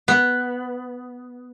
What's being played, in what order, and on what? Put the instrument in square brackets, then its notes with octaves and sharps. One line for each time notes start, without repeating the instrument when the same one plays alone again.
[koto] B3